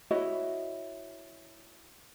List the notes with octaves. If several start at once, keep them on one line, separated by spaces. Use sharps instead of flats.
E4 F#4 C#5 D#5